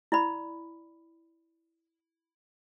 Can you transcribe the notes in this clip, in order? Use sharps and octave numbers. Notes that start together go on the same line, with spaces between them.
E4 D5 B5